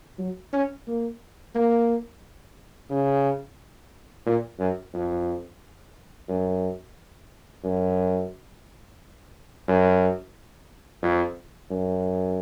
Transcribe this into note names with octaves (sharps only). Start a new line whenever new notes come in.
F#3
C#4
A#3
A#3
C#3
A#2
F#2
F2
F#2
F#2
F#2
F2
F#2